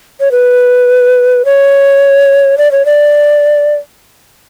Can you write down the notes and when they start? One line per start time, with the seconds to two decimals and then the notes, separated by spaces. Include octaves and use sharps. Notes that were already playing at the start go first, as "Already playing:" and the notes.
0.20 C#5
0.31 B4
1.45 C#5
2.58 D5
2.72 C#5
2.86 D5